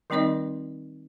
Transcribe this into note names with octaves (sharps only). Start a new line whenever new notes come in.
D#3 G3 C4 D#4 D5 D#5